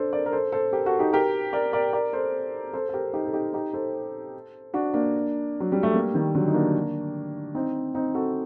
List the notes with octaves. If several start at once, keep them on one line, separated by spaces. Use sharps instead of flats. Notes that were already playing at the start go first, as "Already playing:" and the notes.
Already playing: D4 A4 C5
A#4 D5
A#4
A4 C5
A4 C5
G4 A#4
F#4 A4
D#4 G4
G4 A#4
A#4 D5
A#4 D5
A#4 D5
A4 C5
A4 C5
A4
G4 A#4
D#4 G4
A4
D#4 G4
D#4 G4
A4 C5
D4 F#4
A#3 D4
F#3
G3
A3
G3 A#3
D#3 G3
D3 F#3
D#4
A#3 D4
C4 D#4
C4 D#4
F#4 A4